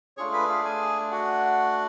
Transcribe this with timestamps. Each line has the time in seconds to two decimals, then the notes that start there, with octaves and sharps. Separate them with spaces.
0.17 A3 D4 F4 G#4 C#5 C#6
0.33 B4 B5
0.49 F4 F5
0.64 G#4 G#5
1.12 F#4 F#5